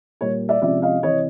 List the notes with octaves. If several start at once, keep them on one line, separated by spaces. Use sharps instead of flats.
A#2 G3 A#3 C#5
D5 E5
C3 F3 G#3 C#4 D5 E5
D#5 F5
C3 E3 C#5 D#5